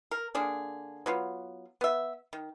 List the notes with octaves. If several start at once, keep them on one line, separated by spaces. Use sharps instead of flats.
A#4
D3 A#3 D4 G#4
F#3 B3 F4
B3 E5
D#3